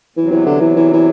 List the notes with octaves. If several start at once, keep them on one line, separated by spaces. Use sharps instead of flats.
E2 C3 E3 F#3
E3
D3
E3
E3
E3